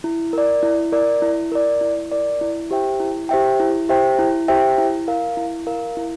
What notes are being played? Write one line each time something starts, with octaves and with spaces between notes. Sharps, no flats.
E4
A#4 D5
E4
A#4 D5
E4
A#4 D5
E4
A#4 D5
E4
G4 C5 E5 G5
E4
G4 C5 E5 G5
E4
G4 C5 E5 G5
E4
G4 C5 E5 G5
E4
A#4 F5
E4
A#4 F5
E4